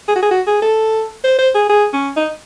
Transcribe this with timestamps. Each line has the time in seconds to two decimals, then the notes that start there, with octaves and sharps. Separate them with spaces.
0.08 G#4
0.16 F#4
0.23 G#4
0.31 F#4
0.47 G#4
0.62 A4
1.24 C5
1.39 C5
1.55 G#4
1.69 G#4
1.93 C#4
2.17 D#4